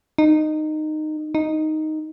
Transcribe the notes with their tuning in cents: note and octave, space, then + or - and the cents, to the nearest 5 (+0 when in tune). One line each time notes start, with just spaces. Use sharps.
D#4 -15
D#4 +0